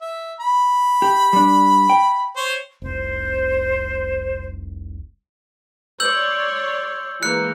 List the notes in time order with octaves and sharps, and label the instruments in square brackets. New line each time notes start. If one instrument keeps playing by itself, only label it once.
[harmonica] E5
B5
[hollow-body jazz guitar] G4
G3 D4
G5
[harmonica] C5 C#5
[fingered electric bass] F1 C2 [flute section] C5
[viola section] C#5 D5 C6 [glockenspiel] E6 G6 F#7
[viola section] E3 G#3 A#3 [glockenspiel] F#6 C#7